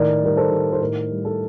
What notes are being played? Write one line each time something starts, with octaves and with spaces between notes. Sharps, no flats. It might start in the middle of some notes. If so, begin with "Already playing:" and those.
Already playing: A2 D#3 A#4 D5
G3 A#4
A4 C5
D#3
C5
A2 A#4
G3
A4